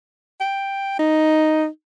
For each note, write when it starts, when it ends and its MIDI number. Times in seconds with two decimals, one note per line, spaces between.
0.40 0.95 79
0.99 1.67 63